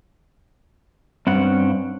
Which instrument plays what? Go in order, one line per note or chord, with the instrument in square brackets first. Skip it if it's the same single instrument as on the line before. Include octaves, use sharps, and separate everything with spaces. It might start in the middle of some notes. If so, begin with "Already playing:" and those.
[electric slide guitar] G2 [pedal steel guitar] C4 C#4 F#5